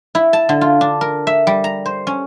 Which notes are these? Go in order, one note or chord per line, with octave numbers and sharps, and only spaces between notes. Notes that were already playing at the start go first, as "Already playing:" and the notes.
E4
A5
D3
F4
D4
A#4
E5
G3
A#5
C5
C#4